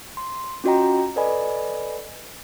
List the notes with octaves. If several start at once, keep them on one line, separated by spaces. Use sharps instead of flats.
C6
C#4 F4 F#4 D#5 G5 A#5
A4 B4 D5 D#5 G#5 B5